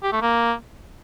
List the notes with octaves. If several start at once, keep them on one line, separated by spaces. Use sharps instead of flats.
G4
A3
A#3